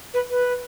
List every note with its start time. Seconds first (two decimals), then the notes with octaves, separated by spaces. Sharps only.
0.14 B4
0.30 B4